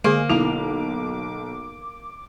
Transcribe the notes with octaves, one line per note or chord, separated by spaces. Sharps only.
D3 G#3 A#3 G#4 F5
B1 E4 F5 D6 F7